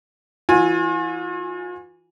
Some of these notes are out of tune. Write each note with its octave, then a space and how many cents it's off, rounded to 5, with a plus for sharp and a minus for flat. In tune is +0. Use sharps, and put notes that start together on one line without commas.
E3 +0 F4 +45 G#5 +0